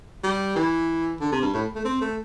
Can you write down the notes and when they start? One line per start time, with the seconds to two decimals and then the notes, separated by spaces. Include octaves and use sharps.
0.23 G3
0.56 E3
1.20 D3
1.32 C3
1.42 G2
1.54 A2
1.75 A3
1.85 C4
2.01 A3